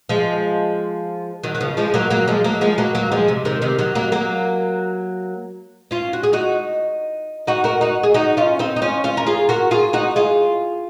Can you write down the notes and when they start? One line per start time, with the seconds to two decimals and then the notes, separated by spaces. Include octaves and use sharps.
0.09 F3 G#3
1.44 D#3 F#3
1.55 F#3
1.61 C#3 F3
1.77 F3 G#3
1.94 F#3 A#3
2.11 F#3 A#3
2.28 F3 G#3
2.44 F#3 A#3
2.61 F3 G#3
2.78 F#3 A#3
2.95 F#3 A#3
3.12 F3 G#3
3.28 C3
3.45 C3 D#3
3.62 C3 D#3
3.79 D#3 F#3
3.95 F#3 A#3
4.12 F#3 A#3
5.91 C#4 F4
6.13 F#4
6.23 G#4
6.33 D#4 F#4
7.47 D#4 F#4
7.64 F#4 A#4
7.81 D#4 F#4
8.03 G#4
8.14 D#4 F#4
8.37 C#4 F4
8.59 C4 D#4
8.76 D#4
8.82 C#4 F4
9.04 C#4 F4
9.17 A#4
9.27 F4 G#4
9.49 F#4 A#4
9.71 F4 G#4
9.93 D#4 F#4
10.16 F4 G#4